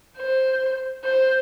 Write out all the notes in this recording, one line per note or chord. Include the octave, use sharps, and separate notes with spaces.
C5
C5